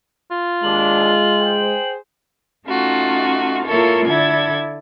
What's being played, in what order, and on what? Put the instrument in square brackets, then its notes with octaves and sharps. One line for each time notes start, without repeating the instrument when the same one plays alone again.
[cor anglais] F4
[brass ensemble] D#2 D4 [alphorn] G#3 [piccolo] F#7
[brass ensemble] G#4 C5 G5
[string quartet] A3 C#4 D#4 F4 F#4
A#3 E4 F4 A4 A#4 C#5
D3 E4 A4 D5 G#6